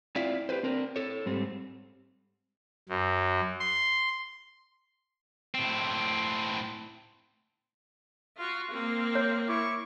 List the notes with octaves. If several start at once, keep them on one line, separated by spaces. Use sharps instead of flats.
C4 E4 F4 D5 E5 F5
G4 G#4 B4 C5
C4 D4 A#4
A4 C#5
G#2 G3 C4
F#2
C6
A2 C4
F4 F#4
A#3 C4
C#5
E4 C#6 D6